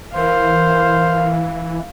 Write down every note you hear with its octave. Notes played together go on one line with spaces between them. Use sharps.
E3 A#4 C5 F5